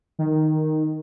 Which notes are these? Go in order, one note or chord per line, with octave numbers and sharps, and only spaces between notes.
D#3